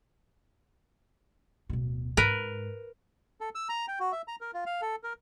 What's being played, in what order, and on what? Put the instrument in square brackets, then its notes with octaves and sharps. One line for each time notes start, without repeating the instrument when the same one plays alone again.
[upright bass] D1 B2
[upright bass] G#2 [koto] A#4 B4
[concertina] A4
E6
A#5
G5
F#4
E5
A#5
A#4
F4
F5
A4
A#4